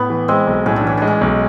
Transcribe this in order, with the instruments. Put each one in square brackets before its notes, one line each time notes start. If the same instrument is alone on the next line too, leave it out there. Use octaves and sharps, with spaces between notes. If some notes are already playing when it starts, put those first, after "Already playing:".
Already playing: [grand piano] A2 [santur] B3
[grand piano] E3
[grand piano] G#3 [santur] C4
[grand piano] B1
[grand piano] A2 [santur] C#4
[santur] D4
[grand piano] E3 [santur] C#4
[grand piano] G#3 [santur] D4
[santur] C#4
[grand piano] B1